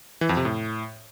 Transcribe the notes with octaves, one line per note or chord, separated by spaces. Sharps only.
E3
F2
C3
A2